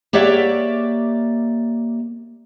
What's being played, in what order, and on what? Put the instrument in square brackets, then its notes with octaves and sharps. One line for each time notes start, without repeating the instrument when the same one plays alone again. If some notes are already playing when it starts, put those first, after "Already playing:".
[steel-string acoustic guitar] A#3 G4 C#5 D5 E5 F#5